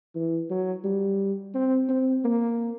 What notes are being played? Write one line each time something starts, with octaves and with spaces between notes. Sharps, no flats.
E3
F#3
G3
C4
C4
A#3